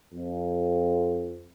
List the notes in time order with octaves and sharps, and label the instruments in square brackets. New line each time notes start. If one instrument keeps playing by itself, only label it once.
[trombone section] F2